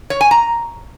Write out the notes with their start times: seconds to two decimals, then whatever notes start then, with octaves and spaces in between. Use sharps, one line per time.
0.10 C#5
0.21 G#5
0.31 A#5